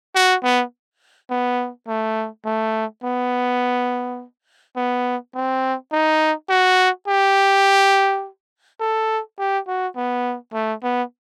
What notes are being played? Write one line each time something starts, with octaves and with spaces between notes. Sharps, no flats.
F#4
B3
B3
A3
A3
B3
B3
C4
D#4
F#4
G4
A4
G4
F#4
B3
A3
B3